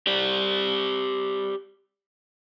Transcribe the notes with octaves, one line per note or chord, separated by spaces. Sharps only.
G4 C5 D5